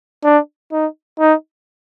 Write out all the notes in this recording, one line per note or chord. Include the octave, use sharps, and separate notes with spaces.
D4
D#4
D#4